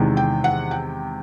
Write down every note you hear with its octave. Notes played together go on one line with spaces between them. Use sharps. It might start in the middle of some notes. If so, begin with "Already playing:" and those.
Already playing: E2 C3 D#3 G#3
G5
F#5
G5